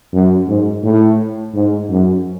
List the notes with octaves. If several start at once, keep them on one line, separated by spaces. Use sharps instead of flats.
F#2
G#2
A2
G#2
F#2